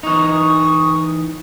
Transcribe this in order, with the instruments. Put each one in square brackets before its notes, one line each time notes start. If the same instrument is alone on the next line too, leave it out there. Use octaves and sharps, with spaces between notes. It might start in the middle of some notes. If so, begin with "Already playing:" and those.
[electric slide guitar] E3 D#4 [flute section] C#6 D#6